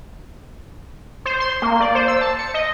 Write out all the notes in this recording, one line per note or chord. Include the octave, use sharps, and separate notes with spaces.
C5
C6
A#3
D5
C5
E6
A5
C#7
D#5